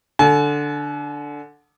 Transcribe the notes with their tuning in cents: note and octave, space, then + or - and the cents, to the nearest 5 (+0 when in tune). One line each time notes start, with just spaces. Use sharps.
D3 +0 G#5 +45